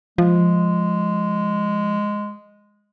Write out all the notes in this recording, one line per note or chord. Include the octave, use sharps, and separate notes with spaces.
F3 G#3